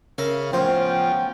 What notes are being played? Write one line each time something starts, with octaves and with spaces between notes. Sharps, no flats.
C#3 A#4 E5 F5
A2 F3 B3 C#4 C5 G5